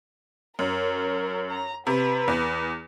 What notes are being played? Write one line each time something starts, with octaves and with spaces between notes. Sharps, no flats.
F#2 A#4
A#5
C3 B4
E2